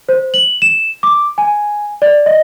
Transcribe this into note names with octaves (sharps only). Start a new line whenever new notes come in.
C5
F#7
E7
D6
G#5
D5
D#5